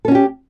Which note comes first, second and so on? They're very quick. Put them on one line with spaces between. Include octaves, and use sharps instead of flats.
A4 C#4 F#4 G4